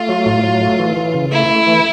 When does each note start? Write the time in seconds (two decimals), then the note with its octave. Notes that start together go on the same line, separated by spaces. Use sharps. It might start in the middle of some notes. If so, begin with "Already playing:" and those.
Already playing: A3 F4
0.09 F#3
0.26 A2
0.44 F#3
0.61 A3
0.79 E3
0.97 E3
1.14 C#3
1.32 A3 E4
1.49 A3
1.67 E3